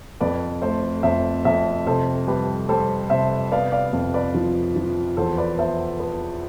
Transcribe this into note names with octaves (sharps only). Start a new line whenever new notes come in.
F2 B4 D5
A3 A4 C5
F2 C5 E5
F2 C5 E5
C3 A4 C5
G3 G4 B4
G3 A4 C5
C3 C5 E5
B3 D5 F5
D5 F5
F2
B4 D5
F3
F3
E2 A4 C5
B4 D5
B3 C5 E5
B3